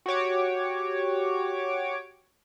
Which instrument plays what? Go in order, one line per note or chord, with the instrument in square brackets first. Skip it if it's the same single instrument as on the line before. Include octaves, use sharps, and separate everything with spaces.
[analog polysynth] F#4 G4 C#5 D6